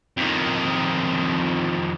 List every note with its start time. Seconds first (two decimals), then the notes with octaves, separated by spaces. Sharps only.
0.17 F2 D#3